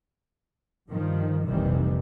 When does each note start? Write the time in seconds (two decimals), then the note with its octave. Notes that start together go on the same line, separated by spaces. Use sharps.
0.88 G2 D#3 F3
1.47 F1 A#1 C3 D#3 E3 G3